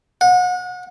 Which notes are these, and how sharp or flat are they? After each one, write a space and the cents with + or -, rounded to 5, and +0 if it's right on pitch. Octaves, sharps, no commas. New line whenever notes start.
F#5 -35